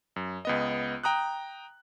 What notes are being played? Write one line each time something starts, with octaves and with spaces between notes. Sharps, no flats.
F#2
C#2 B3 D#5
G5 A#5 D#6 F#6